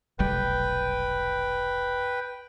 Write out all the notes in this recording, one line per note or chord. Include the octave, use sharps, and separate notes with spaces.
F1 B1 G3 B4 G5